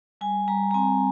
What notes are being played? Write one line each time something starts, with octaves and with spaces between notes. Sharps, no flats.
G3 G#5
G3 A#5
A#5
C4 G#5